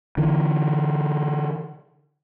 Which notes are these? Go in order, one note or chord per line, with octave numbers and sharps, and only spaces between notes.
D3 E3